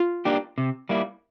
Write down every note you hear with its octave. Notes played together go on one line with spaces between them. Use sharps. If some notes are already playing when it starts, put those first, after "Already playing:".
Already playing: F4
A#3 D4 G4
C3
G3 A#3 E4